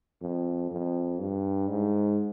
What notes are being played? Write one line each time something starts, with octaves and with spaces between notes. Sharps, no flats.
F2
F2
G2
G#2